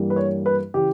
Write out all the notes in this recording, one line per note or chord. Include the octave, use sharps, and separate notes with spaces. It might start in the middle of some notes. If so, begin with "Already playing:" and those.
Already playing: G2 E3 G3 A#3
B4
C#5
B4
C#3 E3 G4